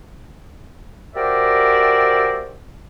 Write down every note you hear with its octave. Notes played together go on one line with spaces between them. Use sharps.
F#4 G4 A#4 C5 D5 E5